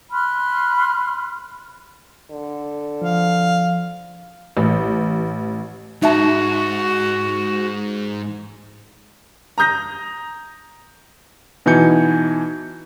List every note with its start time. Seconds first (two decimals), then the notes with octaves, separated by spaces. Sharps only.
0.12 B5 C6 F6 F#6
2.31 D3
3.02 F3 F5
4.57 A1
6.02 G#2 D#4 F#4 E5 A5
9.58 A#5 D#6 G6 A#6
11.66 B2 E3 D#4 G#5 G6 C#7